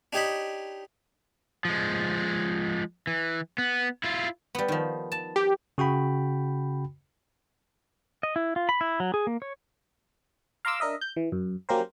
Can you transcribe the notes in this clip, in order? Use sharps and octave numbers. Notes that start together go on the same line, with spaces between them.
D4 D#4 G4 C#5 D#5 B5
F3 G#3
E3
B3
E4 F4
G3 B3
D#3 F3
A5
G4
C#3 F#4 G5 B5
D#5
E4
F4
B5
E4
F#3
G#4
A#3
C#5
F5 A#5 C6 D6 E6
D4 A#4 D#5 E5
G6
E3
F#2
F#3 A#3 C#4 G4 A#4 C5